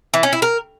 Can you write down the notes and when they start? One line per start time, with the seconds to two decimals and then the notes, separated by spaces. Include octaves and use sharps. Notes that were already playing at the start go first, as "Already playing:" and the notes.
0.14 E3
0.23 C#4
0.33 E4
0.42 A#4